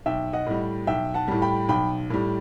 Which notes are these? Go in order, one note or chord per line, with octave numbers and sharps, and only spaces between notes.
B1 E5 G5
D#5 F#5
A2 G3
B1 E5 G5
F#5 A5
A2 G3
G5 B5
B1 G5 B5
A2 G3